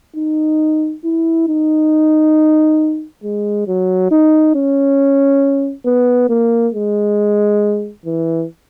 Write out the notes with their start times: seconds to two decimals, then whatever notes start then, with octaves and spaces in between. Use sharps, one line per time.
0.16 D#4
1.04 E4
1.48 D#4
3.23 G#3
3.67 F#3
4.11 D#4
4.55 C#4
5.85 B3
6.29 A#3
6.74 G#3
8.05 E3